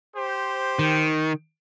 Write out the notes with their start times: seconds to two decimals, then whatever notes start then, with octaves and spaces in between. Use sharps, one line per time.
0.16 G4 C5
0.79 D#3